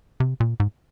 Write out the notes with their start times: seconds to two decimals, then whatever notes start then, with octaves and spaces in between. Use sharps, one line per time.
0.20 C3
0.40 A#2
0.60 G#2